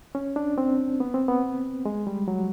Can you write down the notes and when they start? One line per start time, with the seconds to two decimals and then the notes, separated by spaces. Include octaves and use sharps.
0.15 C#4
0.36 D4
0.58 C4
1.00 B3
1.14 C4
1.28 B3
1.85 G#3
2.07 G3
2.28 F#3